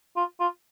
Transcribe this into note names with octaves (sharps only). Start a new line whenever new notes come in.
F4
F4